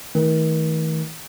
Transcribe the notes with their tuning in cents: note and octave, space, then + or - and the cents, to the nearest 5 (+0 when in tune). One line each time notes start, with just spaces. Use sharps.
D#3 +40 A3 +0